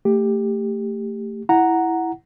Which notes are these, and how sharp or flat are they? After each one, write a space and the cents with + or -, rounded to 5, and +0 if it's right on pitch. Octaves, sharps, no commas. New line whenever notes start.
A3 +20 G4 +15
E4 +0 F#5 +0 A#5 +0